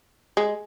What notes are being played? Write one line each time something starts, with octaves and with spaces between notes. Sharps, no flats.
G#3